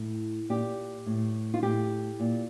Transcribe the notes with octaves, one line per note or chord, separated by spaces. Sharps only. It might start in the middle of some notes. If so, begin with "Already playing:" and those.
Already playing: A2
A#2 G4
A2
F4
A2 G4
A#2